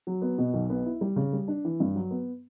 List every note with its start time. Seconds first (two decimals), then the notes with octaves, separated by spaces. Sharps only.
0.07 F#3
0.22 B3
0.38 B2
0.54 B1
0.70 B3
0.85 E4
1.01 G3
1.16 C#3
1.33 G3
1.48 D4
1.65 E3
1.80 G2
1.95 F#3
2.11 B3